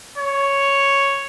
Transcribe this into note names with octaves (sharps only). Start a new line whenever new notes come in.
C#5